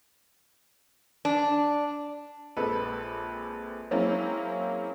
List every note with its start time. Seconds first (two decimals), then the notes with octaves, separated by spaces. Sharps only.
1.25 D4
2.57 A#1 G#3 C4 A4 B4
3.91 F#3 G#3 A#3 C4 C#4 E4